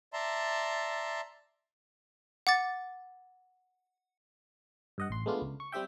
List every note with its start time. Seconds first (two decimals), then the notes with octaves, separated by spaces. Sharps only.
0.13 D5 E5 A5 A#5 C6
2.47 F#5 D6 A6
4.98 G2 D#5 F#5
5.10 A1 C6
5.26 G#3 A3 B3 D4 F4
5.42 C#2
5.60 C#6
5.72 G3 C4 G4 E5 G5